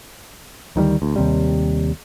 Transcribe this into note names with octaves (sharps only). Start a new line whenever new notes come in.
D2 D#3 F#3 G3
D2
D#2 C3 G3